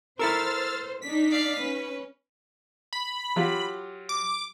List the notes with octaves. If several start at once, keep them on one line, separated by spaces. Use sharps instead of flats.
E4 A4 A#4 C5 E6 F6 A6
D4 D#4 B6
D5 F5
C#4 B4
B5
F#3 F4 G4
D6